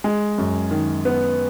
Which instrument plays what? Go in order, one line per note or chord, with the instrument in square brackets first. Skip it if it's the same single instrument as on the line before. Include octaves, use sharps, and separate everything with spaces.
[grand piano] G#3
F#2
D#3
B3